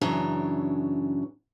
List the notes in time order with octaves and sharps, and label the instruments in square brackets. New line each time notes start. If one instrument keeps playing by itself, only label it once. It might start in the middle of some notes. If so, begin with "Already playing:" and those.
[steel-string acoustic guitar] F#2 C#3 E3 D4 C#5 A#5